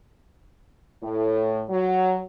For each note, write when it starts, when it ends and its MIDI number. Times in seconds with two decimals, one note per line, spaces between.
1.02 1.60 45
1.69 2.20 54